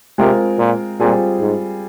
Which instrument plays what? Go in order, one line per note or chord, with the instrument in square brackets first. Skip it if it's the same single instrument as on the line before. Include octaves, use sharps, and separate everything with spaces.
[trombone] C3 [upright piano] G#3 C4 F4 A#4
[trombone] A#2
[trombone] A#2 [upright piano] G3 C4 F4 G#4
[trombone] G#2